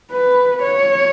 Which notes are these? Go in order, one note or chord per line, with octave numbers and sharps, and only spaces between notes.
B4
C#5